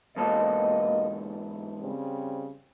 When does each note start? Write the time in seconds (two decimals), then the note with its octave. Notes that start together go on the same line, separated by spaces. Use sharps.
0.16 E2 G#2 B2 A#3 A4 D#5
1.80 C#3 G3 C4